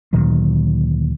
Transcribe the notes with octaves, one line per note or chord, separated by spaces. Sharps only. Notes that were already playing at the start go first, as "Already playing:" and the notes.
D2 A#2 D#3 F#3